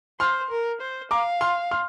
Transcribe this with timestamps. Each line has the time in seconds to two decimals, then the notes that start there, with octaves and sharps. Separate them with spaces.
0.20 C5 C6 F6
0.50 A#4
0.81 C5
1.11 F5 A#5 D6
1.41 C6 F6
1.71 C6 F6